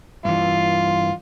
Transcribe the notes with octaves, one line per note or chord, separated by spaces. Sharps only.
G2 E3 F4